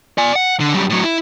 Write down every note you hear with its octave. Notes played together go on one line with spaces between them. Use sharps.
D5 G#5
F#5
D3
F#2 G3
A2 F#3
E4